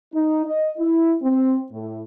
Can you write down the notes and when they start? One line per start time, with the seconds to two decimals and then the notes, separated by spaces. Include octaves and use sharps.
0.14 D#4
0.45 D#5
0.78 E4
1.22 C4
1.71 A2